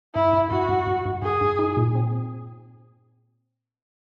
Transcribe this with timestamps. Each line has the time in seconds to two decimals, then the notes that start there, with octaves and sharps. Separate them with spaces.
0.14 G2 E4
0.33 G2
0.51 G2 F#4
0.69 G2
0.86 G2
1.06 G2
1.22 G2 G#4
1.41 G2
1.59 D#4
1.77 A#2
1.95 C4